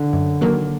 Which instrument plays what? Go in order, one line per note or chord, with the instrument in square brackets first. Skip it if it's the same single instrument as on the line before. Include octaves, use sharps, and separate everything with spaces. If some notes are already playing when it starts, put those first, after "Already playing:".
Already playing: [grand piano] D3
[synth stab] F#2
D#3 F#3 A#3